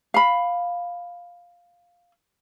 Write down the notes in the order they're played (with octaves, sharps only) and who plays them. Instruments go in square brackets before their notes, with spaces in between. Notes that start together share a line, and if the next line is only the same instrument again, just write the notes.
[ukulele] F5 B5